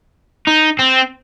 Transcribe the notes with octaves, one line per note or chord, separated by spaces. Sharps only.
D#4
C4